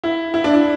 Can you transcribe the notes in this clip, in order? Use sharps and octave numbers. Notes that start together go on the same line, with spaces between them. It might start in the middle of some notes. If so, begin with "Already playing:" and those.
E4
E4
D4
E4